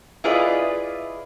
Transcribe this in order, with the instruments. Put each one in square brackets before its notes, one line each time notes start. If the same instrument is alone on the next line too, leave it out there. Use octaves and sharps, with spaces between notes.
[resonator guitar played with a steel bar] E4 F4 G#4 B4 D5 D#5